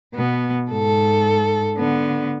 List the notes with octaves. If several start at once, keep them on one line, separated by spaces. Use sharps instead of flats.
B2 B3
G#2 A4
D3 B3